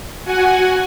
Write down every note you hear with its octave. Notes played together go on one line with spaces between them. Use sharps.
F#4 F#5 G#5